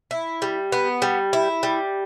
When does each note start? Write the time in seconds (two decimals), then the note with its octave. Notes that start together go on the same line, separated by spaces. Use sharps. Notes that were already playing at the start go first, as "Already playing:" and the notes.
0.11 E4
0.42 G3
0.72 B3
1.02 G3
1.33 E4
1.63 G3